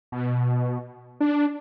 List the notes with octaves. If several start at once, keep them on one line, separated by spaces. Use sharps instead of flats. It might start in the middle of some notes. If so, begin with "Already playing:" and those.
B2
D4